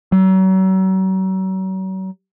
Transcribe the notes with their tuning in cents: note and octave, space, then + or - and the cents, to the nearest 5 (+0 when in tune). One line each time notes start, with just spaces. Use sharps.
F#3 +40